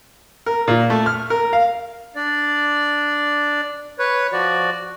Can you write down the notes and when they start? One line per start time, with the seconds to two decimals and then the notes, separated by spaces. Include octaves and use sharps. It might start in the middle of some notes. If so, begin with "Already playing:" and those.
0.46 A#4
0.68 A#2
0.90 A3
1.06 F6
1.30 A#4
1.53 F5
2.16 D4 D5
3.99 B4 C#5
4.32 F3 F#4 D5